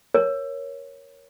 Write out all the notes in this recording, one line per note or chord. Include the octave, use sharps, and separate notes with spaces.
A#4 C#5